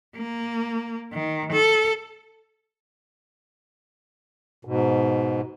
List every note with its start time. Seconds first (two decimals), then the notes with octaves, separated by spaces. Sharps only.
0.16 A#3
1.13 D#3
1.52 A4
4.65 G#2 B2